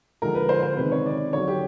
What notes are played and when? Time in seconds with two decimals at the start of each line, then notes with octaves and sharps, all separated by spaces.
0.22 D3 F3 G#3 A#4
0.35 B4
0.49 C5
0.63 C5
0.77 C3 D#3 G#3 B4
0.92 C#5
1.06 D5
1.33 D3 F#3 C#5
1.48 G4